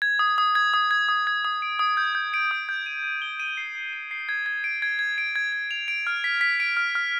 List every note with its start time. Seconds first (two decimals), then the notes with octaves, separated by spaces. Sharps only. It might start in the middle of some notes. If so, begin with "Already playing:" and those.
0.02 G#6
0.19 D#6
0.38 D#6
0.55 G#6
0.74 D#6
0.91 G#6
1.08 D#6
1.27 G#6
1.45 D#6
1.62 D7
1.79 D#6
1.97 G6
2.15 G6
2.34 D7
2.51 D#6
2.69 G6
2.86 D#7
3.04 D#7
3.22 G7
3.40 D#7
3.57 C7
3.75 C7
3.93 D#7
4.11 C7
4.29 G#6
4.46 G#6
4.64 D7
4.82 G#6
4.99 G#6
5.18 D7
5.36 G#6
5.52 G#6
5.71 F7
5.88 D7
6.07 F6
6.24 B6
6.41 B6
6.60 D7
6.77 F6
6.95 F6